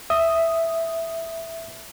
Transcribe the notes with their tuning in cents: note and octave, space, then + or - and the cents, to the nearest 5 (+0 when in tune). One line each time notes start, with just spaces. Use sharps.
E5 +0 D#6 +0